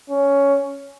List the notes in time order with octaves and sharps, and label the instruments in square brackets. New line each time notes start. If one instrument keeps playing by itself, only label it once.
[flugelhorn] C#4